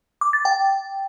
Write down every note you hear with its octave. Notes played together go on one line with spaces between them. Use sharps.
D6
A6
G5